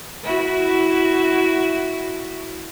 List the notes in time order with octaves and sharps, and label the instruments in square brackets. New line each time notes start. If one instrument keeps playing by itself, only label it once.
[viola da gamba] E4 F#4